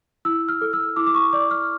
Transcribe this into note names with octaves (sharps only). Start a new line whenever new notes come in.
E4 E6
F6
A4
E6
E4 D6
D6
C#6
D5 D6
F6